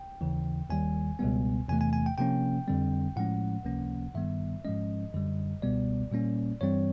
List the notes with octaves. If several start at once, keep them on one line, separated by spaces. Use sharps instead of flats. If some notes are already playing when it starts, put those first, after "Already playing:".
Already playing: G5
D#2 C#3 E3
D#2 D#3 G3 G#5
C#2 B2 G3 B3
E2 C3 E3 A3 G#5
G#5
G#5
G5
C3 F3 A#3 C#4 G5
F2 D3 G3 C4
A2 F3 G#3 C#4 F#5
C#2 C3 F3 A#3 C#4
G2 D#3 G3 B3 E5
G#2 F3 G#3 C#4 D#5
F#2 D3 G3
C#2 B2 G3 B3 D5
A#2 G3 A#3 C#4
G2 E3 G3 C4 C#5